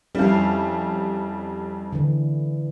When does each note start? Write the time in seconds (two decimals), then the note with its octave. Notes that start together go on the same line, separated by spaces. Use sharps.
0.15 F2 G3 C#4 E4 F5
1.93 D3 E3